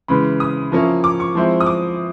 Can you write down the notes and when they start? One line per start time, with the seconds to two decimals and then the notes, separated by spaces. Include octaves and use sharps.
0.08 C#3 E3 G#3 B5
0.40 D#6
0.72 F3 A#3 C#4 E4
1.04 D6
1.20 C#6
1.35 F3 G#3 C4 E4
1.60 D#6
1.66 D6